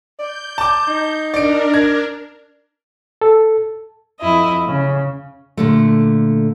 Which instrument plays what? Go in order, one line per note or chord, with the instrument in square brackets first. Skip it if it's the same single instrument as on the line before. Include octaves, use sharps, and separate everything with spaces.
[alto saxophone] D5 [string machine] G6
[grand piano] A5 D6
[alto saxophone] D#4
[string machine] D4 A#4 [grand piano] D5 D7
[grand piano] G#6
[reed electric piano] A4
[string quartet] F2 E4 D#5
C#3
[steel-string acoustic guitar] A#2 D3 A3